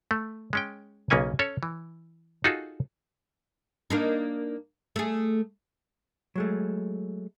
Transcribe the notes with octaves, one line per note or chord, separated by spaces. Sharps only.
A3
G#3 C#4 G5
B1 C#3 A#3 C#4 G#5
C#4 A4 C#5
E3
D#4 F4 F#4 G#4 A4
A#3 D4 D#4
A3 G#4
F#3 G#3 A3